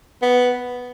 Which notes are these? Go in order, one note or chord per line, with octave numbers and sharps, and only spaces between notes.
B3